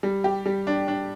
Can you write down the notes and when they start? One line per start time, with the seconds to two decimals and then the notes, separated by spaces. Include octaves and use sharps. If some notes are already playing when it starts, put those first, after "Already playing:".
0.03 G3
0.24 G4
0.46 G3
0.67 D4
0.88 D4